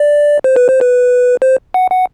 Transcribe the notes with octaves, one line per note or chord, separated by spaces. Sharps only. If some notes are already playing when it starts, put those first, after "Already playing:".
Already playing: D5
C5
B4
C5
B4
C5
F#5
F#5